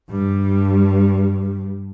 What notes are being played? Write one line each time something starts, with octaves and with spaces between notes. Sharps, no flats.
G2 G3